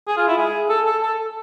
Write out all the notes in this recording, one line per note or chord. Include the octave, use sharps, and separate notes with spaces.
G#4
F4
E4
G#4
A4
A4
A4